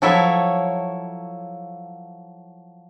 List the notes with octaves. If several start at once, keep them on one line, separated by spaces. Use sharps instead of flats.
F3 F#3 E4 A4 C#5 E5